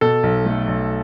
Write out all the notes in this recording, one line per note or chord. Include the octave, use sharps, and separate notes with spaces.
B2 A4
B1
A3
B1